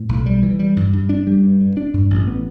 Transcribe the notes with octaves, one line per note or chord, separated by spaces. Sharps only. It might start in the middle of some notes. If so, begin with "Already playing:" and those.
Already playing: A2
B1
G3
E3
G3
G2
G2
D4
G3
G2
G2
D4
G2
A1
B3